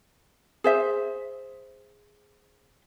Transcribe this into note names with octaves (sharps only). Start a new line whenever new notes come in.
G#4 C5 E5